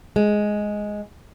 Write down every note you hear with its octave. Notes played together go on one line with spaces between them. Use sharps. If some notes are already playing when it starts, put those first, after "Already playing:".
G#3